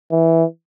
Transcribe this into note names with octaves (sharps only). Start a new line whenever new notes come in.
E3